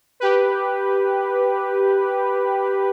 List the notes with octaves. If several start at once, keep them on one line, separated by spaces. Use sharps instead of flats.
G4 B4